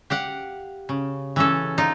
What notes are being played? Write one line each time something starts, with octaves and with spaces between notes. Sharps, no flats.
G4 F5 F#5
C#3
E3 C#4 A4
D#4 F4